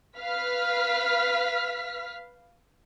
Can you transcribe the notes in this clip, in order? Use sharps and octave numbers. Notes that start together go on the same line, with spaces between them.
B4 F5 F6 B6